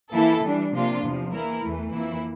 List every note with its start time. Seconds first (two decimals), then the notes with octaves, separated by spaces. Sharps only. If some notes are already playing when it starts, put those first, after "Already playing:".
0.13 E3 A#3 E4 A4
0.43 E3 G3 D4
0.73 C3 F3 A#3 D4 F4
1.03 E2 C3 F3
1.32 E3 A#3 E4 A#4
1.63 E2 E3 A3
1.93 F2 E3 A#3 E4